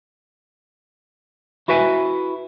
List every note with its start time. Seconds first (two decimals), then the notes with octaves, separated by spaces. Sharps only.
1.68 E4 F#4 B4 E5 G#5